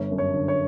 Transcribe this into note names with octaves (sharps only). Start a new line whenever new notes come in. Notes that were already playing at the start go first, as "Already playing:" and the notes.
Already playing: G1 C#5
F#2
C#5
D3
C#5